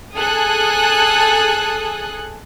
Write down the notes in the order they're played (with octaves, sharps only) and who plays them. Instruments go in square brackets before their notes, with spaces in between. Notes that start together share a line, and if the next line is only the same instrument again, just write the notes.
[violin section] G#4 A4 G#5 D#6 F#6